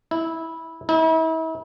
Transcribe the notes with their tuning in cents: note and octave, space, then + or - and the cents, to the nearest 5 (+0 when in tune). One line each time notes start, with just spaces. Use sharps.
E4 -15
E4 -40